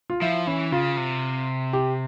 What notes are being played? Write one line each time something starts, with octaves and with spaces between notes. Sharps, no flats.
F4
F3 E4
E3 C#4
C#3 F4
C3
G4